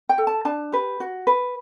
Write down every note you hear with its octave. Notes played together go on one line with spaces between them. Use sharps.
G5
A4
A5
D4 A5
G4 B4
F#4
B4